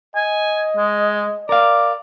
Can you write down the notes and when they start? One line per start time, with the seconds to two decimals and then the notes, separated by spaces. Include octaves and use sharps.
0.16 D#5 G#5
0.77 G#3
1.49 A#4 D5 F5